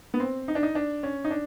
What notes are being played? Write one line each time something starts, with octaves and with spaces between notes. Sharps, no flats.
B3
C4
D#4
D4
D#4
D4
C#4
D#4
D4